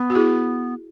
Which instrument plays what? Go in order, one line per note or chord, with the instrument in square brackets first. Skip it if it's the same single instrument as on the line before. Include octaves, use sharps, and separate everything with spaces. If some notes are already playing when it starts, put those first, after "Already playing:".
Already playing: [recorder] B3
[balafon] F#4
E4 G#4